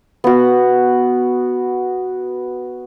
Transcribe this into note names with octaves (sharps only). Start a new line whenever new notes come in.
B3 F#4